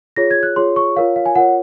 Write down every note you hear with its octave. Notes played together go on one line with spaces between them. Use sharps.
F4 G#4 C#5 A#6
G#6
F#6
F4 G#4 C#5 C6
C#6
F4 A#4 C#5 F5
F5
G#5
F4 A#4 C#5 F#5